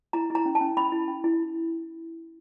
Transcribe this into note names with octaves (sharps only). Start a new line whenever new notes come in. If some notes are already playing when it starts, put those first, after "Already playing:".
E4 A#5
E4 A#5
C#4
A5
C#4
C#4 B5
E4
C#4
E4